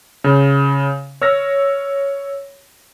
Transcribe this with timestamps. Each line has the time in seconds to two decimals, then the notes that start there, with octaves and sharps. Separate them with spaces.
0.24 C#3
1.21 C#5 E6 F6 A#6